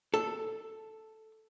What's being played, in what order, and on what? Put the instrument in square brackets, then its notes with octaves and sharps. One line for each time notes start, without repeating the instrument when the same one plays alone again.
[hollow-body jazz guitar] A4